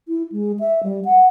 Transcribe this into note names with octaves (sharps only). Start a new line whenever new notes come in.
E4
G#3
E5
G3
F#5